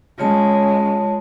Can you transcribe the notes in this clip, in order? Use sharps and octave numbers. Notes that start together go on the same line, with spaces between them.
C#3 G#3 F4 C#5 A5